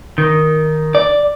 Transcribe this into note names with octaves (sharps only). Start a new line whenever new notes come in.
D#3
D5